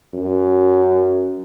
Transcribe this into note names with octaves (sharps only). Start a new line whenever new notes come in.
F#2